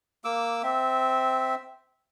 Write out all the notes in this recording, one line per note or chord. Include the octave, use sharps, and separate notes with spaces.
A#3 D6 E6
C4 E5